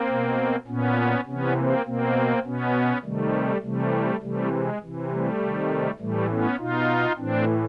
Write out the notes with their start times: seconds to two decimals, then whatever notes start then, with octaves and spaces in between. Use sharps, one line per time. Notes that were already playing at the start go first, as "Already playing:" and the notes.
Already playing: A#3 C4
0.08 B2
0.67 A#2 B3 C#4
1.27 C3 E3 B3 C#4
1.56 A#3 C4
1.86 B2 A#3 C4
2.45 B2 B3 C#4
3.04 C3 D#3 G3 A3
3.63 C3 E3 G3 A3
4.22 C3 E3 G3 A3
4.52 G#3
4.82 C3 E3
5.11 G3 A3
5.40 C3 D#3
5.99 A2 E3 G3 A3
6.29 B3 C#4
6.59 B2 D#4 F4
7.18 A2 E3 C4 D4